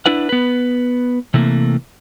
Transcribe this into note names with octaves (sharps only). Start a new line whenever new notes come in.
D4 E4 B4 F#5
B3 B4
C3 E3 A3 A#3